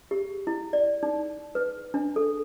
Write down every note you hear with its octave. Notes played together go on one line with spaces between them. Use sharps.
G4
E4
D5
D#4
B4
D4
A4